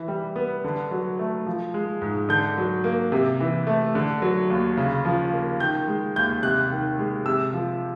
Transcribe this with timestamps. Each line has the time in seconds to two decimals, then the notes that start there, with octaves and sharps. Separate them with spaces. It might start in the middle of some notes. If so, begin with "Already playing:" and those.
Already playing: E3
0.08 G3
0.36 B3
0.64 D3
0.91 F#3
1.19 A3
1.46 F3
1.74 G#3
2.02 G#2
2.29 D3 G6
2.58 F#3
2.84 A#3
3.12 C3
3.40 E3
3.67 A3
3.95 D3
4.22 F#3
4.50 D#2
4.77 C#3
5.05 F3
5.33 A#3
5.60 D#3 G6
5.88 G#3
6.16 D#2 G6
6.43 C3 F#6
6.71 D#3
6.99 G#3
7.25 C3 E6
7.53 F3